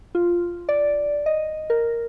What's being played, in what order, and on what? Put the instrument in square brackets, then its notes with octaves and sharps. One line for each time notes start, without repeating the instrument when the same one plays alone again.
[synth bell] F4
D5
D#5
A#4